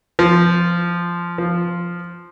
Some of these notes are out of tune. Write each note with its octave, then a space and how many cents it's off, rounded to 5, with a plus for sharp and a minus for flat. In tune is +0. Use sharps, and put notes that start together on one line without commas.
F3 -10
F3 -5